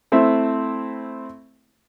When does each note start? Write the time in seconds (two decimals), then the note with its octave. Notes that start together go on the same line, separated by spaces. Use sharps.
0.12 A3 C4 E4 E5